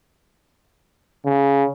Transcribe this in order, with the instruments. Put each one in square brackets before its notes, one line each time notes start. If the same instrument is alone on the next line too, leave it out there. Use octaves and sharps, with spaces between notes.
[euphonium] C#3